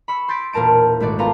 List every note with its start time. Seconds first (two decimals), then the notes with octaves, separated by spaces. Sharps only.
0.08 B5 C#6 E6
0.28 C6 G6 A6 B6 D7
0.53 E1 A#2 A#4 A5 D7
1.00 G#1 A3 F#4 D5
1.19 B3 F4 F5 A5 A#5